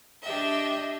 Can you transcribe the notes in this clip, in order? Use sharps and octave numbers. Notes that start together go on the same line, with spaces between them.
D4 G4 D#5 E5